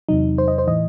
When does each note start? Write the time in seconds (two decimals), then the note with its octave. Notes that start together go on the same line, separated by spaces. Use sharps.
0.09 E2 C3 F#3 D#4
0.38 C5
0.48 D#5
0.58 C5
0.67 A2 E3 D#5